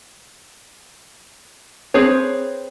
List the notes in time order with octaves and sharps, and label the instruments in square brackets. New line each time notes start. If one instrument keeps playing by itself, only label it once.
[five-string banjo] C4 G#4 B4 C#5